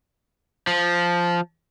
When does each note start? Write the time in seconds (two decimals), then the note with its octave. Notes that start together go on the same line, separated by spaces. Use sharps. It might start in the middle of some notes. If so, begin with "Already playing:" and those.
0.67 F3